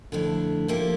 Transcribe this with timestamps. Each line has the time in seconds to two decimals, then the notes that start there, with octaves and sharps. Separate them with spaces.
0.12 F2 D3 A3 E4
0.68 F3 A#3 E4 G4